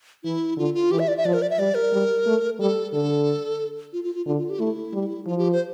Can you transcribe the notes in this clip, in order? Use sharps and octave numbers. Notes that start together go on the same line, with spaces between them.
E3 E4
D3 F4
F4
E3 G4
E5
D5
E5
F3 D5
A#4
D5
E5
G3 D5
A#4
G3
A3
G3 A4
D3 A4
F4
F4
F4
D3 F4
F4
G4
A3 E4
G3
F3 F4
G4
C5